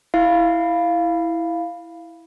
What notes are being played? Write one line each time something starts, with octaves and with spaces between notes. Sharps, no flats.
E4 F5